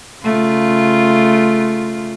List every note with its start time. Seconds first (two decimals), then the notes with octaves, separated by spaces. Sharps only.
0.23 C#3 A3 F4